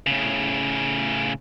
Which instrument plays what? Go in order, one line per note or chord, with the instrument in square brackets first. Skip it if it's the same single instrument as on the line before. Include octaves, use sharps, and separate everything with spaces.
[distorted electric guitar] A2 C#3